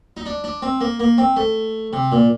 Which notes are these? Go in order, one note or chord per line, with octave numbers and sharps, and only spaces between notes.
D#4
D4
D4
C4
A#3
A#3
C4
A3
C3
A#2